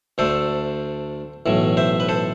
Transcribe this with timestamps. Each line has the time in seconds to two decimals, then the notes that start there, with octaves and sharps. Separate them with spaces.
0.18 D2 D3 A3 A4 C5
1.46 B1 A2 E3
1.77 C5 E5
2.00 B4
2.09 A4 C5